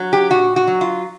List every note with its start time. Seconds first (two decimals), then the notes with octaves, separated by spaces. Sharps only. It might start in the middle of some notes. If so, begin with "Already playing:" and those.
Already playing: F#3
0.13 G4
0.30 A#2 F#4
0.56 F#4
0.67 F#3
0.81 F4